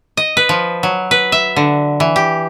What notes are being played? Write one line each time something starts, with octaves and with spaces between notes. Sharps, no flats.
D#5
B4
F3
F#3
B4
E5
D3
E3
G4